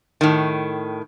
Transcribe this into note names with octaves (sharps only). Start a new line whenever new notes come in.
A2 D#3